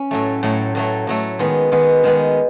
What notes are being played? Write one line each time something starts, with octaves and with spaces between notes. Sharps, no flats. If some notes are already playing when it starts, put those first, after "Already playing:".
Already playing: C#4
A2 F#3 A3
A2 F#3 A3
A2 F#3 A3
A2 F#3 A3
D#3 G#3 B3
D#3 G#3 B3
D#3 G#3 B3